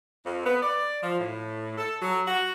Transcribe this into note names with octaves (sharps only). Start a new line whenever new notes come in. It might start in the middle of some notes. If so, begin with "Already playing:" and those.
F2
B3
D5
F3
A2
A4
F#3
F#4